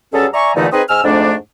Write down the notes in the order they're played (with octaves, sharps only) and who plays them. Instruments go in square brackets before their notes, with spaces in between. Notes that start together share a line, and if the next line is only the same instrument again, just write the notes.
[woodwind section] G2 F#3 C#4 G#4 A4
D5 E5 G#5 A#5 C#6
E2 A#2 D3 E3 A3 D#4
C4 D#4 G#4 B4 D#5
G#2 G#5 E6 F6
F2 G#2 A3 D4